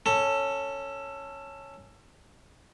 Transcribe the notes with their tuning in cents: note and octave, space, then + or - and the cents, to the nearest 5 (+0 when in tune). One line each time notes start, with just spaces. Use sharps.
C#4 +0 A4 +15